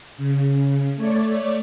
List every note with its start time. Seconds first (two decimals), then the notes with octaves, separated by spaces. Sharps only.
0.17 C#3
0.96 A3 C#5 D5